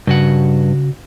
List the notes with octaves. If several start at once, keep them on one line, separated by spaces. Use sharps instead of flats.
G2 C#3 F#4 F#5